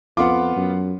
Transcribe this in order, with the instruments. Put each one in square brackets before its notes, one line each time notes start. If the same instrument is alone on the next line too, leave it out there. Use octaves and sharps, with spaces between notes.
[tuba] F2 [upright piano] B3 F4 [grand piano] F#5 C6 D6
[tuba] F#2